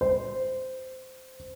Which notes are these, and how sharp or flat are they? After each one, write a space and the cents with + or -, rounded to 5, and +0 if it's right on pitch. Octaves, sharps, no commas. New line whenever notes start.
C5 -10